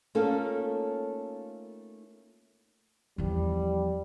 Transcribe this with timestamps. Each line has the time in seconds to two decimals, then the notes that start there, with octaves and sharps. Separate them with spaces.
0.15 A3 A#3 C#4 D#4 F4 A4
3.18 E2 F3 G3